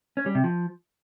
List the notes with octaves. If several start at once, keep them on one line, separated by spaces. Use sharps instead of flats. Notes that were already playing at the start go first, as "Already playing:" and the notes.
C#4
G3
C3
F3